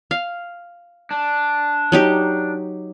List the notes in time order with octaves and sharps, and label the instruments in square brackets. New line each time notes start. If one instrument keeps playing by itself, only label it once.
[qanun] F5
[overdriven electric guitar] D4
[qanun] F#3 D#4 G4